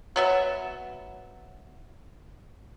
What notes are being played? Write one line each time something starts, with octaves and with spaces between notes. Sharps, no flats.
F#3 B3 E5